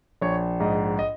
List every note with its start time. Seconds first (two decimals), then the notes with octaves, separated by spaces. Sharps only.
0.21 A#1 C#5
0.60 G#2 D#5
0.99 D#5